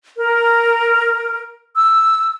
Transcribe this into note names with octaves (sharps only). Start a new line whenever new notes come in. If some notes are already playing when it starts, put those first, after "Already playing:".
A#4
E6